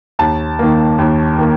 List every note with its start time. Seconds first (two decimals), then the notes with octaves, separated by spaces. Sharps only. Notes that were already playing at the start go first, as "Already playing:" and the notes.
0.19 D#2 A5
0.59 D#3 A#3
0.99 D#2
1.39 D#3 A#3